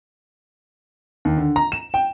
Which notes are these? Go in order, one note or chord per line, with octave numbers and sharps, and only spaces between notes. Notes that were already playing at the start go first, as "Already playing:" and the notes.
D#2
D3
A#5
E7
G5